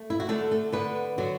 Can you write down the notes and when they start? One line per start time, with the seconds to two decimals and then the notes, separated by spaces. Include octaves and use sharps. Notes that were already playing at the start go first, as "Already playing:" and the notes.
Already playing: A3
0.10 E4
0.20 F#4
0.29 D3 A3 A4
0.51 A3 A4
0.72 D3 B3 B4
1.18 D3 F#3 F#4